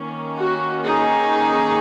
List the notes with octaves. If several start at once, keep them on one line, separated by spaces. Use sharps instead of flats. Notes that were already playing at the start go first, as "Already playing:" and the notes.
Already playing: D#3 A#3 C#4
F#4
D#4 G#4